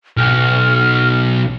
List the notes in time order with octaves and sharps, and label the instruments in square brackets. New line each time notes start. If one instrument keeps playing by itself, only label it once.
[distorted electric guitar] B1 [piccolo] F6